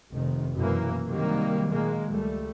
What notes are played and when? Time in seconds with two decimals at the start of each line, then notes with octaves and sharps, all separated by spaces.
0.13 F1 D#3
0.55 F#2 B2 E3 A#3
1.08 C3 D#3 F#3 G3 A#3
1.71 A#2 D#3 G#3 A#3
2.07 C#2 G3 A3